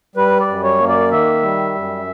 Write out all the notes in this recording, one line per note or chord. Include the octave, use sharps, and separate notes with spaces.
G3 B4
D5
F#2
C#5
A#3
D5
D#3 E5
G3
F#2